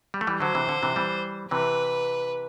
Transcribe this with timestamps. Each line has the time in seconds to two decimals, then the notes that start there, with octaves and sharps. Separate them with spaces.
0.14 G3
0.21 A3
0.27 E3 G3
0.40 D3 F#3 C5
0.55 C3 E3
0.69 D3
0.83 C3 E3
0.96 E3 G3
1.51 C3 E3 B4